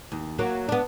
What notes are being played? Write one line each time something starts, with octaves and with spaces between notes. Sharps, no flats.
D#2
F#3 A#3 F#4
B3 D4